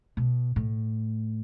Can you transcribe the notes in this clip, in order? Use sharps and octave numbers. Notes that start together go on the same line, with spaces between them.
B2
A2